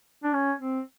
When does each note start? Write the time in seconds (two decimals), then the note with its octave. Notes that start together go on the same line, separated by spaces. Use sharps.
0.24 D4
0.33 C#4
0.61 C4